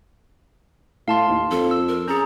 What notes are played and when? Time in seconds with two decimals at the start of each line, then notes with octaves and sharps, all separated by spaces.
1.08 A2 F5 A5 C6
1.29 D#2
1.51 F2 A4
1.71 E6
1.88 A#4
2.08 C#4 G#4 A#5